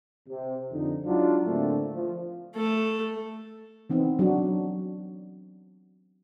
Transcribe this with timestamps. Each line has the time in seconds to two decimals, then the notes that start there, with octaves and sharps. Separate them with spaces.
0.29 C3
0.71 F2 D3 D#4
1.05 F#3 G#3 D4 D#4 F4
1.45 A2 D3 A3 A#3 C4 D4
1.93 F3
2.55 A3 A4
3.90 E3 B3 C4 D#4
4.19 F#3 D4 F#4